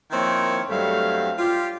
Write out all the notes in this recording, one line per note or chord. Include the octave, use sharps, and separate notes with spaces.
D#3 F3 A#3 C4 E4 C#5
G2 F#3 G3 A3 C4 F5
F4 G4